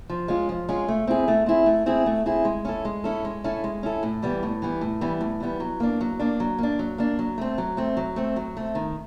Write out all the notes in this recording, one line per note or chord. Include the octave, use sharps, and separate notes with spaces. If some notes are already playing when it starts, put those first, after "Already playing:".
F3
G#3 C#4 F4
F3
G#3 C#4 F4
A3
C4 E4 G#4
A3
C4 E4 G#4
A3
C4 E4 G#4
A3
C4 E4 G#4
G#3
C#4 E4 A4
G#3
C#4 E4 A4
G#3
C#4 E4 A4
G#3
C#4 E4 A4
A2
E3 G3 B3
A2
E3 G3 B3
A2
E3 G3 B3
A2
E3 G3 B3
F#3
A#3 D4
F#3
A#3 D4
F#3
A#3 D4
F#3
A#3 D4
F#3
A3 C4
F#3
A3 C4
F#3
A3 C4
F#3
A3 C4
D#3